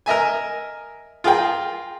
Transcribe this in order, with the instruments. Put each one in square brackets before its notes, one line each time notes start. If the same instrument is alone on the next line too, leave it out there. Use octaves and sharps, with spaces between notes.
[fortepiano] A#4 D#5 E5 G#5
F4 G#4 A#4 G5